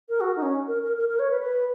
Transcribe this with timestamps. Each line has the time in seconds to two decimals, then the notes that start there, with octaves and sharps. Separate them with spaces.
0.09 A#4
0.21 F#4
0.36 D#4
0.42 C#4
0.68 A#4
0.83 A#4
0.97 A#4
1.09 A#4
1.19 C#5
1.31 B4
1.41 B4